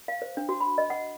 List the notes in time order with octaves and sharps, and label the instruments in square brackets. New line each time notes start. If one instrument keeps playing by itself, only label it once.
[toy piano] F5
C5
D4
F#4
B5
D#5
F#5